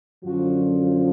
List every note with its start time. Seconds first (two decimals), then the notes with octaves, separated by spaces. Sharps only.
0.24 F#2 D3 F3 F#4